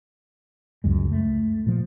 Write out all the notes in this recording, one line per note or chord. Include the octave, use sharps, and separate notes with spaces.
C#2 F#2 G#3
A3
A#2 F3